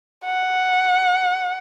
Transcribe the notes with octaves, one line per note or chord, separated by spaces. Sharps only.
F#5